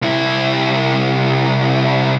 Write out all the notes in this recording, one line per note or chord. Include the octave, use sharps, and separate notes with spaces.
C2 E4